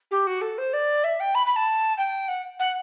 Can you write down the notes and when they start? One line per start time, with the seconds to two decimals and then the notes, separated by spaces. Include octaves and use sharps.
0.11 G4
0.27 F#4
0.41 A4
0.58 C5
0.73 D5
1.04 E5
1.20 G5
1.35 B5
1.46 B5
1.56 A5
1.98 G5
2.28 F#5
2.59 F#5